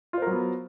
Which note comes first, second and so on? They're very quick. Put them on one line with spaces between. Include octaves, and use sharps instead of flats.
F4 C5 A#4 F#3 B3